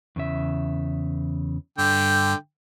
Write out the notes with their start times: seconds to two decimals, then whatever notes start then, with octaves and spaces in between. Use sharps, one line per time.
0.16 E2 C#3 E5
1.78 G2 D3 G5